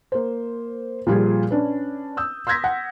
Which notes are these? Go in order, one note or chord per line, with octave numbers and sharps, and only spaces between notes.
A#3 C5
A#2 F3 G3 F4 G4 G#4
C#4 D4 B4
D#6 E6 G6
C6 E6 G6 G#6 A#6 B6
F#5